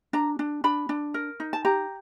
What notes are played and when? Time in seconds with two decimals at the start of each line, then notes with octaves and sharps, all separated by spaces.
0.13 D4 A#5
0.39 D4
0.64 D4 B5
0.89 D4
1.14 A#4
1.40 D#4
1.53 A5
1.65 G4 A#5